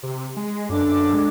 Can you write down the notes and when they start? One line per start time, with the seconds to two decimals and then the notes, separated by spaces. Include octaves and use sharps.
0.03 C3
0.37 G#3
0.69 F#2 D4 A4 D6
0.87 F#2
1.13 G#3